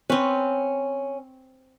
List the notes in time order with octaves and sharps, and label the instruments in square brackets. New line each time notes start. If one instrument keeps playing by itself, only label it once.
[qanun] C4 B4 [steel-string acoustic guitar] C#4